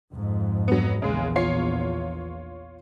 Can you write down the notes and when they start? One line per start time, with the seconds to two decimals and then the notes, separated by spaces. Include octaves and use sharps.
0.13 F2 G#2
0.68 F#3 B3
1.02 A#1 E2 C#3 G#3
1.36 F4 C#5 C7